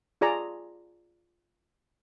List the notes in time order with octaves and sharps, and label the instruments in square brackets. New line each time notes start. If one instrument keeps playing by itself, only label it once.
[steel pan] F4 G#4 D5 G#5 A#5